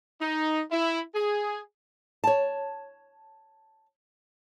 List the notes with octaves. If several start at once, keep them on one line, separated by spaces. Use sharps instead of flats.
D#4
E4
G#4
C#5 A5